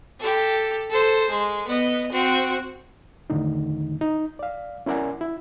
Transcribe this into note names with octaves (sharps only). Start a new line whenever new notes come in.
G4 A4
A4 C5
G#3
B3 D#5
C4 F#4
E2 A2 D3 D#3 D#4
D#4
D5 F5
C#4 E4 A#4 D5 F#5 G#5
E4